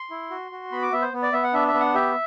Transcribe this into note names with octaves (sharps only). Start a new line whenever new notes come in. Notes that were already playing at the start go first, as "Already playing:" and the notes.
Already playing: C6
E4
F#4
F#4
B3 B5
D6
B3 E5
C5
B3
D5
B3 E5
F#5
D4 E5
E5
B3
F#5
G4 E5